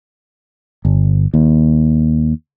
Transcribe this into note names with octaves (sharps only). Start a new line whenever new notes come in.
G1
D#2